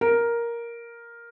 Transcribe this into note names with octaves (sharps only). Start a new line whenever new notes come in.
A#4